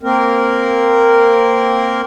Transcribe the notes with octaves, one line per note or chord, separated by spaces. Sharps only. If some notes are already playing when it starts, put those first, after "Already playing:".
A#3 C4 A#4